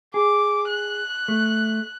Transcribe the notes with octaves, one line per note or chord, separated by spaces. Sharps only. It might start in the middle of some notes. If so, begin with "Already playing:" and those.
G#4 D6
F#6
A3